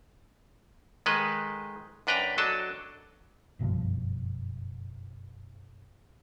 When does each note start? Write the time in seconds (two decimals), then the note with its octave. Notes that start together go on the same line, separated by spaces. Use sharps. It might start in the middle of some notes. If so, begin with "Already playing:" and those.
1.06 D#3 G#3 A4 B4 D#5
2.07 F#2 D4 B4 G5 A#5
2.38 F#3 D4 A4 D#5 A5
3.59 F#1 B1 G2 F3